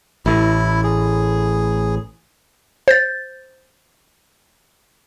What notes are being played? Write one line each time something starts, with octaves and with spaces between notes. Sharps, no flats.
A1 A2 E4
G#4
C5 G6 A6